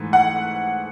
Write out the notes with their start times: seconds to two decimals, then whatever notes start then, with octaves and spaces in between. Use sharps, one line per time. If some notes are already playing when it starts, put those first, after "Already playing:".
Already playing: G#2 E3 A3
0.13 F#5